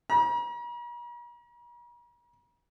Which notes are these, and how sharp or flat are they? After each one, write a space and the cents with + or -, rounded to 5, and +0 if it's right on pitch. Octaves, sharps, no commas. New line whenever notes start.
A#5 +45